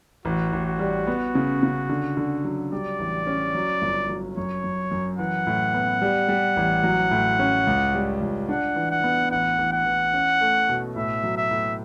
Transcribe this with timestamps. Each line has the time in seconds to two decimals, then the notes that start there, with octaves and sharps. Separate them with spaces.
0.25 A1 F#4
0.53 A1
0.66 F#4
0.79 G3
1.07 B3
1.35 C#3
1.63 C#3
1.89 D3
2.17 D3
2.44 F#3
2.72 G3 D5
2.99 A1
3.27 C#4
3.54 F#3
3.82 G1
4.09 F#3
4.37 F#2 C#5
4.64 F#2
4.91 F#2
5.19 E3 F#5
5.47 A2
5.74 B3
6.02 G3
6.28 G3
6.57 A1
6.83 F#3
7.11 A2
7.39 C#4
7.67 C#2
7.94 G3
8.21 C#2
8.49 D4 F#5
8.76 E3
8.91 F#5
9.04 B3
9.31 A1 F#5
9.58 A1
9.72 F#5
9.86 E3
10.14 C#4
10.41 A3
10.69 B2
10.96 A2 E5
11.23 F#3
11.37 E5
11.51 A2